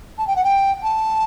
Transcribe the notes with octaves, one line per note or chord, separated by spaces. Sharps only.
A5
G5
F#5
G5
A5